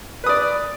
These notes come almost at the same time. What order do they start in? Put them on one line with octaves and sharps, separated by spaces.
B4 D#6 D5